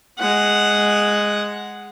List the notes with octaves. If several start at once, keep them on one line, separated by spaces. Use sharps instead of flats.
G#3 F#5